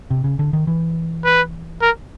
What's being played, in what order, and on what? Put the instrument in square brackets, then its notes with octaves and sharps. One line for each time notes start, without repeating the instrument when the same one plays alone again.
[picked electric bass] C3
C#3
D3
D#3
E3
[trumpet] B4
A#4